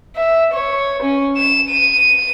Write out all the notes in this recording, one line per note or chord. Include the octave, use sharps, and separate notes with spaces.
E5
C#5
C#4
E7
D#7